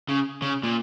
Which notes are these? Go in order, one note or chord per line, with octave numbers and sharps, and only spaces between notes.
C#3
C#3
A#2